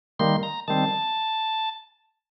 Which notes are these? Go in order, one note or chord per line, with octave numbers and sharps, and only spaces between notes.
D#3 G3 A#3 C6
A#5
D#3 G3 C4 A5